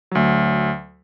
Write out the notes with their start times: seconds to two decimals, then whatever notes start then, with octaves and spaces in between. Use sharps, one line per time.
0.11 D2 F#3